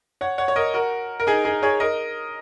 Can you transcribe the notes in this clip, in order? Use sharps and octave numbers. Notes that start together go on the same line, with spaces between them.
C#5 F#5
C#5 F#5
C#5
A#4 D#5
F#4 A#4
A#4
D#4 G#4
D#4 G#4
G#4 C#5
A#4 D#5